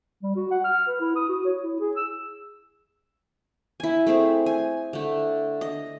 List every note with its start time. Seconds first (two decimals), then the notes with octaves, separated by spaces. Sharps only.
0.23 G3
0.36 F#4
0.51 F#5
0.64 F6
0.88 B4
1.01 E4
1.16 D#6
1.29 F#4
1.45 C#5
1.63 E4
1.80 G#4
1.96 E6
3.80 E4 G#5
4.07 A3 C4 G#4 C5
4.46 G#5
4.93 D3 A3
5.61 D#5